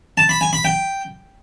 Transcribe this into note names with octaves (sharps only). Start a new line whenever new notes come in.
A5
B5
G#5
B5
G5